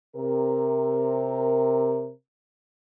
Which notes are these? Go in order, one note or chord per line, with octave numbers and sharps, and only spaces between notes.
C3 A#4